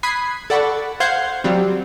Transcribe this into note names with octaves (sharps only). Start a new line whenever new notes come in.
B5 D#6 F#6 G#6 B6 C7
A4 D5 F#5 A5 B5 C#6
C5 F5 F#5 G6 G#6 C7
F#3 G3 C4